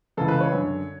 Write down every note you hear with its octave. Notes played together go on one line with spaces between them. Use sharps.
C#2 C#3 E3 A4
B4
C#5
F#2 D3